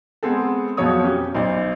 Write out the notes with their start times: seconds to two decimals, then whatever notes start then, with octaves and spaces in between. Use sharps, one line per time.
0.23 G#3 B3 C4 G#4 A4
0.77 F2 B2 F3 F#3 C#5 D#6
1.04 C#4 G4
1.35 B1 C5 D5